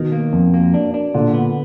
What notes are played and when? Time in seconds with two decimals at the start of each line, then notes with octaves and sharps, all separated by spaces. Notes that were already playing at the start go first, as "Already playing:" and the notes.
Already playing: B2 D#3
0.12 A#3
0.33 F2
0.54 A#3
0.74 D4
0.94 D4
1.14 A#2 D3
1.34 B3